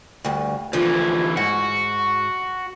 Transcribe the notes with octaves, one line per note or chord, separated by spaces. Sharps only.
D2 G2
D2 E3 F3
G#2 F#4